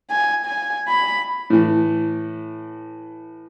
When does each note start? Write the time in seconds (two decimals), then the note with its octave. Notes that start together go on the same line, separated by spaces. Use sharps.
0.11 G#5
0.46 G#5
0.88 B5
1.50 A2 E3